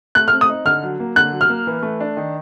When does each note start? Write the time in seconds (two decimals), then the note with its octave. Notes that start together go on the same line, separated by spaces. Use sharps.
0.15 A3 F#6
0.28 F6
0.32 C4
0.41 D#6
0.50 D#4
0.65 D3 F6
0.83 F#3
1.00 A#3
1.16 D3 F#6
1.32 F#3
1.41 F6
1.50 A#3
1.67 E3
1.82 A3
2.00 D4
2.17 D#3